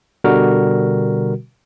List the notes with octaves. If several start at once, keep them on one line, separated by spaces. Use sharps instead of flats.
B2 D3 G3 F#4 A#4